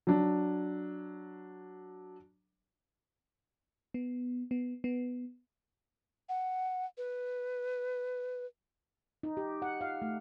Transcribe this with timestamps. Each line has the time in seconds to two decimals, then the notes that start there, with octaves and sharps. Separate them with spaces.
0.07 F#3 D4
3.94 B3
4.51 B3
4.84 B3
6.29 F#5
6.97 B4
9.23 D#4
9.37 G4
9.62 F#5
9.81 F5
10.02 A3